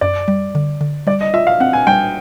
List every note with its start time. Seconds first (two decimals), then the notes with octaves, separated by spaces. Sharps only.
0.01 F#2 D5
0.28 G3
0.55 D3
0.81 D3
1.07 G3 D5
1.21 D#5
1.34 F4 E5
1.47 F5
1.60 C4 F#5
1.73 G#5
1.87 G3 G5